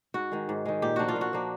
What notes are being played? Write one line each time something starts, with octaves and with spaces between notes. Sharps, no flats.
G#2 F#4
D#3 G#3
G#2
D#3 G#3
A#2 G4
F3 A#3 D4 F#4
F4
A#2
F#4
F3 A#3 D4